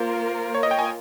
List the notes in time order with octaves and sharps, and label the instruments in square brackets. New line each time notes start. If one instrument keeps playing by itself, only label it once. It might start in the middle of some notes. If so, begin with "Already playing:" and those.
Already playing: [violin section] A#3 F4 A#4 [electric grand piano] C5
[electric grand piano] C#5
D#5
G5
G#5